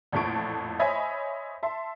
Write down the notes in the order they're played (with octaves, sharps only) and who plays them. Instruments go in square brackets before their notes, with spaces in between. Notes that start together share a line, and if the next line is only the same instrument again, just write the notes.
[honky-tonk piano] A1 F2 A#2 A3 C#6 D7
C5 C#5 D#5 E5 G#5 B5
E5 A5 C6